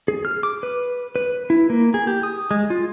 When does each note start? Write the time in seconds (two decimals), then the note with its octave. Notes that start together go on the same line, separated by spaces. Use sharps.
0.08 G#4
0.25 F6
0.43 D6
0.63 B4
1.16 B4
1.50 E4
1.70 A#3
1.94 G#4
2.07 G4
2.23 D#6
2.51 G#3
2.70 F4